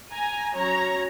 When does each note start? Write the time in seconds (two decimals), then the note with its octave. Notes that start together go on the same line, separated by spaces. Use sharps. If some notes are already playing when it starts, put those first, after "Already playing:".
0.12 G#5 A#5
0.54 F#3 C#4 C#5 A#5